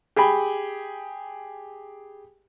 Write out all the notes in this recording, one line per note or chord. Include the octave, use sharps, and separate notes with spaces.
G4 G#4 G5 B5